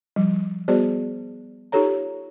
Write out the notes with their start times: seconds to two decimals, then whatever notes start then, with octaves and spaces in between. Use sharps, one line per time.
0.16 F3 G3
0.68 G3 B3 F#4 G#4 C5 D5
1.72 D#4 F4 G4 A4 C#5 A#5